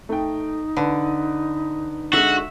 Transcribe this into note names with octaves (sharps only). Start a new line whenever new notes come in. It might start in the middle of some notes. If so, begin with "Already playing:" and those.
A3 D#4 G5
D3 B4
D3 G#3 F#4 E5